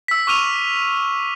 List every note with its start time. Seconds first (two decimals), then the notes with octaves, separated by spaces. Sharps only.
0.08 E6 B6
0.27 C#6 D6 F6 D#7 F7